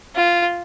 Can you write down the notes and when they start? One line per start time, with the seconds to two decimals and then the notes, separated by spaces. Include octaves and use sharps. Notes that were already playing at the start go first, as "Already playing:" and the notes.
0.15 F4